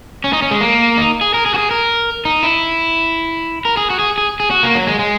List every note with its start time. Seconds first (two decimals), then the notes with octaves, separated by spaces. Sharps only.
0.24 C#4
0.33 D#4
0.42 C#4
0.51 G#3
0.61 A#3
0.97 D#4
1.21 G#4
1.34 A#4
1.46 G#4
1.54 F#4
1.58 G#4
1.71 A#4
2.25 D#4
2.43 E4
3.65 A#4
3.77 G#4
3.90 F#4
3.99 G#4
4.18 G#4
4.40 G#4
4.51 F#4
4.63 A#3
4.75 F#3
4.87 G#3
4.99 G#3